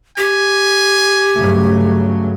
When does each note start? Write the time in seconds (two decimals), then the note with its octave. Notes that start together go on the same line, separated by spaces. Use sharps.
0.18 G4 G#5
1.35 G2 C#3 F#3 A3